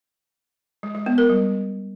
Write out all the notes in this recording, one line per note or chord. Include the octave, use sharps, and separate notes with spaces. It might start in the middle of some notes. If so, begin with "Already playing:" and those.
G#3
G#3
B3
A#4
G3